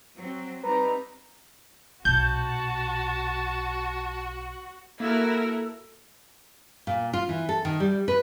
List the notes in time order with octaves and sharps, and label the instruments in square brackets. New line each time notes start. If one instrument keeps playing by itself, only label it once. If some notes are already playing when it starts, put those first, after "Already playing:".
[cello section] F#3 C4
[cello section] G3 C4 D#4 [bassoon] B4 [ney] A#5
[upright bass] B1 A#2 [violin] F#4 [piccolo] A5 [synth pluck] G6
[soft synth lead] A#3 [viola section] E4 F#4 A#4 [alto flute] A4
[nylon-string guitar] A#2
F4
E3
A4
D#3
G3
B4